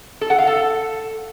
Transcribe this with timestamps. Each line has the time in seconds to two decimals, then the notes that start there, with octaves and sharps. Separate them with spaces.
0.21 A4
0.30 F#5
0.38 F5
0.47 A4